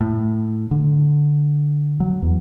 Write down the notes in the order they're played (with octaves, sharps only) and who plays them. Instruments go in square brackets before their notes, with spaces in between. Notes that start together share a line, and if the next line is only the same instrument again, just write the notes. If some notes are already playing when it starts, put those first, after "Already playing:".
[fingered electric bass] A2
D3
F#3
E2